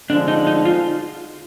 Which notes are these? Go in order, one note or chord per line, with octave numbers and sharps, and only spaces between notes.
D3 F3 G#3 D4
D#4
D#4
F4